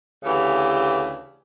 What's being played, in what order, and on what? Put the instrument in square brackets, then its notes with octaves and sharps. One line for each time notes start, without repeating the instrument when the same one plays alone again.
[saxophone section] D2 C#3 E3 G4